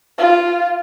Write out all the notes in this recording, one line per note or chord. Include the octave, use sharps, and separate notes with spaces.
F4